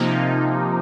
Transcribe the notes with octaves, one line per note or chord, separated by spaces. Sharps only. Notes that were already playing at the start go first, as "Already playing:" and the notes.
Already playing: C3 F3 A#3 D#4